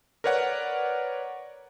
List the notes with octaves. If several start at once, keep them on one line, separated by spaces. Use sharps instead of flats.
A#4 B4 C#5 D5 F#5